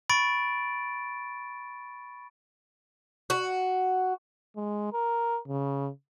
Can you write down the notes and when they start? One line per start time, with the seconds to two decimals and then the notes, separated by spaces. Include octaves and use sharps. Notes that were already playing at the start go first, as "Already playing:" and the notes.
0.09 B5 C#6 A6 D7
3.30 F#4
4.56 G#3
4.93 A#4
5.48 C#3